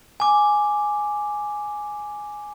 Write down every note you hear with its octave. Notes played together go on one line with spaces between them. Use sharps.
G#5 D6